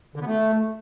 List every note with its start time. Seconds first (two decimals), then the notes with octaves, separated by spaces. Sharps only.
0.16 D3
0.21 B3
0.27 A3